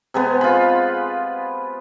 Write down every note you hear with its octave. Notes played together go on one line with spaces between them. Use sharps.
C3 G#3 B3
F4 B5